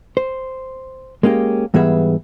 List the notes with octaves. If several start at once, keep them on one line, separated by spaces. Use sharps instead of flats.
C5
G#3 A#3 C#4 G4
G#2 E3 G3 B3 G#4 E5